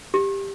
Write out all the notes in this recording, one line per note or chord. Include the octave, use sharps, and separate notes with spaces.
G4